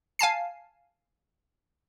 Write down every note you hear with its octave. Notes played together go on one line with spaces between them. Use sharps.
F5 G#5 A5 C7